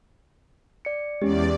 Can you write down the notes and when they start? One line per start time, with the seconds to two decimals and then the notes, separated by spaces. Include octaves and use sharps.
0.85 D5 C#7
1.22 E2 G#3 C#4 G4 D5